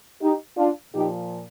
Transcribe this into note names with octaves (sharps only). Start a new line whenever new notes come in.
D#4 G4
D4 F4
A#2 F3 D#4 G4